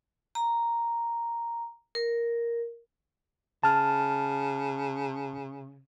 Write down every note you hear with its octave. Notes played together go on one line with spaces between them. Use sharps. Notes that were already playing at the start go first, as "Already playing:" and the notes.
A#5
A#4
C#3 A5 F6